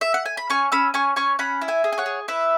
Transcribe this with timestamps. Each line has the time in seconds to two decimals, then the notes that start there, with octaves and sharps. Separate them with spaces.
0.01 E5
0.14 F#5
0.26 G#5
0.37 B5
0.50 C#4 G#5 C#6
0.72 C#4 B5 E6
0.94 C#4 G#5 C#6
1.16 C#4 G#5 C#6
1.39 C#4 F#5 B5
1.61 E4
1.68 E5 G#5
1.84 G#4
1.92 G#5
1.98 C#5 F#5
2.06 G#4
2.28 E4 B4 E5